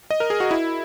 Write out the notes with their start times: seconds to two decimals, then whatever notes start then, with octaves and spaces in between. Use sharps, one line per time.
0.10 D#5
0.20 A#4
0.30 G#4
0.40 F#4
0.51 E4